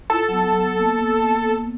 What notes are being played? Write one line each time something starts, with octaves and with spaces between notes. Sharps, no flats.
E4 F4 A4
F#3 B3
A#3 B3